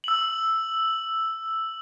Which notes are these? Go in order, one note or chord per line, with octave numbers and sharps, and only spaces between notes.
E6 F#7